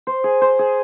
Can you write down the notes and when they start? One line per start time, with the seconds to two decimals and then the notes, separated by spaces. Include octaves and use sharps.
0.07 C5
0.24 G#4
0.41 C5
0.59 G#4